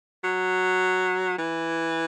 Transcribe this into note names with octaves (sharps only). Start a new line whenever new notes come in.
F#3
E3